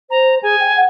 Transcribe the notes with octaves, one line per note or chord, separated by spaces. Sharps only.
C5 A#5
G#4 G#5
G5
F#5